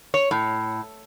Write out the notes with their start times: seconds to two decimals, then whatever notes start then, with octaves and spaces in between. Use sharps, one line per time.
0.14 C#5
0.31 A2